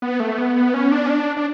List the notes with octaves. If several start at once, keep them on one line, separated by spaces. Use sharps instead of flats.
B3
A3
B3
C#4
D4
C#4
D4
D4